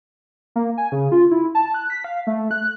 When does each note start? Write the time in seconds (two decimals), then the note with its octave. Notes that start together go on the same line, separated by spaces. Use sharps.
0.56 A#3
0.78 G#5
0.92 C#3
1.12 F4
1.31 E4
1.55 A5
1.74 F#6
1.90 B6
2.04 F5
2.27 A3
2.51 F#6